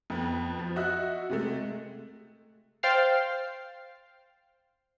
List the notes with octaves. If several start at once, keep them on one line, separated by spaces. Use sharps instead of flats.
F2 B3
F3
F#4 D#5 E5 F#6
C3 G#3 A3
C5 F5 G5 F6 A6 C7